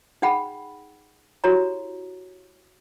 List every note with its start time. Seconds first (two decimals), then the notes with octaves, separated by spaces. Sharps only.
0.22 D#4 G#4 F#5 G5 B5
1.44 E4 F#4 G4 A4 C#5 A#5